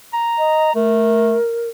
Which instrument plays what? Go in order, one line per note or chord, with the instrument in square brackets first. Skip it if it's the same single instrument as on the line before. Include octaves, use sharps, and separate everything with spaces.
[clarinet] A#5
[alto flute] D#5
[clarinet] A3 [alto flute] A#4